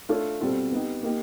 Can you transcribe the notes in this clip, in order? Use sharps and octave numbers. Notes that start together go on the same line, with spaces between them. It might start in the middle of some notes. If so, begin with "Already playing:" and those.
A3 D4 F4 A4 C#5
B2 G3 C4 F4 A4
B3 D#4 G4
A#3 D#4 G4